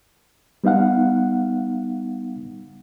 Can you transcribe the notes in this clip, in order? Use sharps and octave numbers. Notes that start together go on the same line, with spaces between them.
G3 B3 D#4 F5 F#5